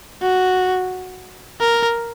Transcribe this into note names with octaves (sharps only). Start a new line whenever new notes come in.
F#4
A#4